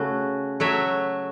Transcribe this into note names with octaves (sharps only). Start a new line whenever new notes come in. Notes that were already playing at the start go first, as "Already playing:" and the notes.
Already playing: C#3 A3 F#4
F#3 A3 F#4 C#5 E5